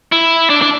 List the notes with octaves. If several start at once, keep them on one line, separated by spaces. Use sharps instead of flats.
E4
D4
D4